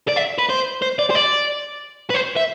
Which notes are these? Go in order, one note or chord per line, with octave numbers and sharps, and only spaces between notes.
D5
E5
B4
C5
C5
D5
C5
D5
B4
C5
E5